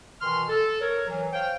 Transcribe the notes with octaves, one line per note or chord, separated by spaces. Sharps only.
B2 D#3 E3 C6 F6
A4
A#4 C#5
E3 F#3
C5 C#5 F5 G5